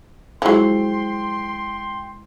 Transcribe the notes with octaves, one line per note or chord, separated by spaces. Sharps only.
F3 F#3 G#3 E4 G#4 G5 C6